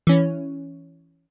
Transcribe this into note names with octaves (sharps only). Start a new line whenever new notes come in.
E3 C#4